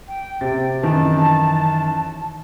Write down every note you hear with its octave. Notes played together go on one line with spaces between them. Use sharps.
G5
C3 C5 A6
F#2 D#3 E3 A5